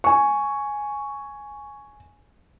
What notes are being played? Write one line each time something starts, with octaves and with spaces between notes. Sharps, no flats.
G#5 C#6